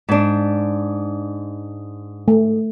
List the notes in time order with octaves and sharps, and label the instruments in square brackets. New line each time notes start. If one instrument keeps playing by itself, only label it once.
[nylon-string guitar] G#2 D4
[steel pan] A3